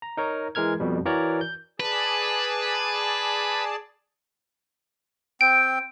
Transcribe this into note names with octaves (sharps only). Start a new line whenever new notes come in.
A#5
D#4 A#4 C#5
E3 G#3 A#4 F6 G#6
F2 B2 G3
E3 F#4 A#4 C#5 D5
G6
G#4 B4 D5 A5
C4 G5 D7